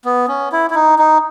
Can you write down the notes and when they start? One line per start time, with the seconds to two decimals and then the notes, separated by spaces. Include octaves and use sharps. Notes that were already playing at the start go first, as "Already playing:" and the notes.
0.05 B3
0.28 C#4
0.52 E4
0.70 E4
0.75 D#4
0.99 D#4